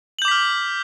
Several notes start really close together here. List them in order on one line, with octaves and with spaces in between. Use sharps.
F#7 G6 D6 B6 F6